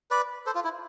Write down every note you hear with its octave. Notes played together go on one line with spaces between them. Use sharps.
B4 D5
A4 C5
F4
E4